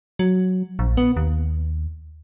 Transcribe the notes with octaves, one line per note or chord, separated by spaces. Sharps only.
F#3
A#1
B3
D#2